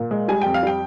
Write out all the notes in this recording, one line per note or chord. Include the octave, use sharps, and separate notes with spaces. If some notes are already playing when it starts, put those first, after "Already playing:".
Already playing: A#2
G#3
G3 G#5
F2 G5
F5
G3 G5